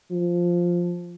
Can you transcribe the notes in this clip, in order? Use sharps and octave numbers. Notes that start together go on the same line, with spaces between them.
F3